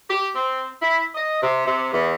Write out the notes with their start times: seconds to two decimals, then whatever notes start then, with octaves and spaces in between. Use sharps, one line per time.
0.10 G4
0.35 C4
0.81 E4
1.15 D#5
1.42 C3
1.66 C3
1.93 E2